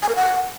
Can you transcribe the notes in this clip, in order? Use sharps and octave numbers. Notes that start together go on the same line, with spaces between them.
G#5
A#4
F#5